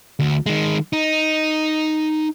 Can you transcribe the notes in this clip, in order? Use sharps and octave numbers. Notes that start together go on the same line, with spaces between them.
D2
D#3 G#3
D#4